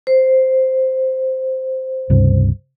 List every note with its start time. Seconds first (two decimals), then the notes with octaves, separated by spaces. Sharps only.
0.07 C5
2.10 C#2 G2 C3